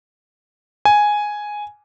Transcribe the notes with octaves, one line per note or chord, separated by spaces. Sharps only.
G#5